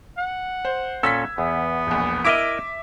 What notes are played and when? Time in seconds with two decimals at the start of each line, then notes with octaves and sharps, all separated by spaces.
0.18 F#5
0.65 C5
1.03 A#2 C#4 A4 E6 G#6 B6
1.38 E2 B3
1.87 E1 A#1
2.25 E4 A#4 D#5 E5 D6 D7